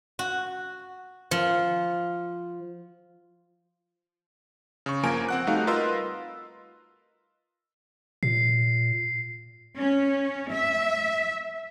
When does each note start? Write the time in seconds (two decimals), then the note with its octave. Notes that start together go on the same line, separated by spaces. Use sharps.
0.19 F#4
1.31 F3
4.86 C#3 C#6
5.03 G1 F3 A#3 A#4 G#5 D7
5.29 C4 F#5 F#6
5.47 G3 A3 D#4 F#4 F5
5.67 F4 A#4 B4 D#5 C6 E6
8.23 A#2 C7
9.78 C#4
10.51 E5